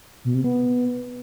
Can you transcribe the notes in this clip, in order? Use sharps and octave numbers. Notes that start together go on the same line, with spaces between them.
B2
C3
B3